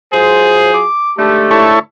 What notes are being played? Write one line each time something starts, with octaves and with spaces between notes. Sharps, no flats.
F#3 F4 G#4 C5
D6
G#2 D3 A3 G4
E4 A4 C#5